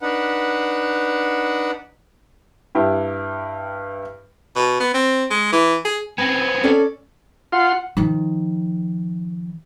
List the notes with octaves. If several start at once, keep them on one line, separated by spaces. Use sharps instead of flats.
D4 D#4 B4 F#5
G2 E4 G4
B2
B3
C4
G#3
E3
G#4
B3 C4 G#5
C#4 A4 D5
F4 F#5 C6
D#3 F3